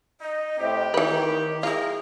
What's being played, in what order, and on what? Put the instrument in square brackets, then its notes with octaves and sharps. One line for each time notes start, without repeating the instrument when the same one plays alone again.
[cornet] D#4 [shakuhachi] D#5
[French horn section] A2 C4 [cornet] G4
[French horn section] D#3 [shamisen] E3 B4 [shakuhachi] E4
[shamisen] E4 F4 [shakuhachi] G#4 [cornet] A#4